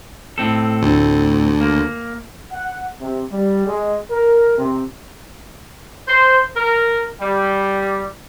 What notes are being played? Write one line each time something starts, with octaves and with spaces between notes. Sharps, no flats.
A2 C4 A4
D2
A#3
F#5
C3
G3
G#3
A#4
C3
C5
A#4
G3